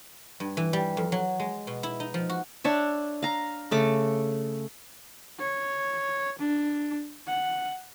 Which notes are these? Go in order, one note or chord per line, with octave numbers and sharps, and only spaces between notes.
G2
E3
G3
F2
F#3
G#3
B2
E4
D#4
F3
F#4
D4 C#5 E5
F5 A#5
C#3 A3 D6
C#5
D4
F#5